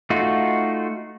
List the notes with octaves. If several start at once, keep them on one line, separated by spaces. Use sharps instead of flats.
A3 D#4 F4 F#4